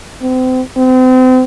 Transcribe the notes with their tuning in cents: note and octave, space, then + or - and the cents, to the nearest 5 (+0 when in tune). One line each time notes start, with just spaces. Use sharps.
C4 -35
C4 -35